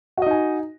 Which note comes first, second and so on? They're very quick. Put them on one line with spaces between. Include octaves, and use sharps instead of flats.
F#4 D#5 D#4 G#5